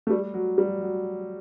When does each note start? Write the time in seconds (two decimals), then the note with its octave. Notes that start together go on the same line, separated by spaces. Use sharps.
0.07 A3
0.10 G3
0.34 F#3
0.58 G3
0.82 F#3